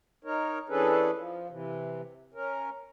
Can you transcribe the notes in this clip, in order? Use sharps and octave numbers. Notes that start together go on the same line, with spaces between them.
D#4 A#4 C#5
E3 C#4 D4 G#4 A4 B4
F3
C3 E3
C#4 A#4